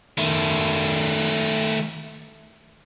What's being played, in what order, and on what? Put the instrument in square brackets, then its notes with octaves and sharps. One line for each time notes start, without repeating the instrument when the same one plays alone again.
[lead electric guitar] D#3 A3